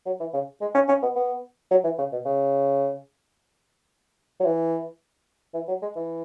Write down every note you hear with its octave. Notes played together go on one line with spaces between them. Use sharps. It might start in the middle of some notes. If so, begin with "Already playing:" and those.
F#3
E3
C#3
G#3
C#4
C#4
B3
B3
F#3
E3
C#3
B2
C#3
F#3
E3
E3
F#3
G#3
E3